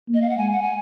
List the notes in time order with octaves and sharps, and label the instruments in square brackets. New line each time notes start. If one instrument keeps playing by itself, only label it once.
[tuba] A#3
[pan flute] D#5
F5
F#5
[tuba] G#3 [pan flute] G#5
[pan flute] F#5
G#5